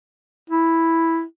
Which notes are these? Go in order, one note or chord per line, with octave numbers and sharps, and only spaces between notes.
E4